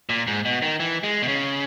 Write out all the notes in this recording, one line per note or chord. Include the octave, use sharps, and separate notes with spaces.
A#2
G#2
B2
D#3
E3
G#3
B2
C#3